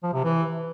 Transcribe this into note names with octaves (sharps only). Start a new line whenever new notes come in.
F3
C3
E3